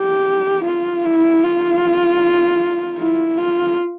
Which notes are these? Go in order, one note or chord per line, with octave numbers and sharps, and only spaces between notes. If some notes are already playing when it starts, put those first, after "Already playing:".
Already playing: G4
F4
E4
F4
E4
F4